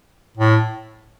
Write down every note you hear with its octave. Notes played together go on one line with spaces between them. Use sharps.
A2